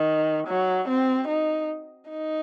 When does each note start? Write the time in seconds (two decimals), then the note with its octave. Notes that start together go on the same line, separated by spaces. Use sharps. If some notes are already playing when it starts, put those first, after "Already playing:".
Already playing: D#3
0.48 F#3
0.89 C4
1.28 D#4
2.10 D#4